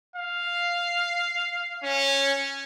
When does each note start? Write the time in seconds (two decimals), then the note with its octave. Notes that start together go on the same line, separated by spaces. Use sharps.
0.16 F5
1.83 C#4